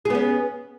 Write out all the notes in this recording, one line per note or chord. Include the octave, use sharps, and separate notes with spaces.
B3 C#4 G#4